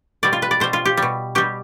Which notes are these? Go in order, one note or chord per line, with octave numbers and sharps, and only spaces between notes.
B2 G3 D5
F4
B4
D5
B2 G3 C5
F4
G4
G3
B2
B2 G3 G4